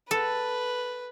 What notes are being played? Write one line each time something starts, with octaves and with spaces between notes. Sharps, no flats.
A4 B4